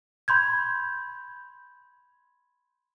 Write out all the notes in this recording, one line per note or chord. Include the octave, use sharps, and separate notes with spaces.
B5 C6 G6 G#6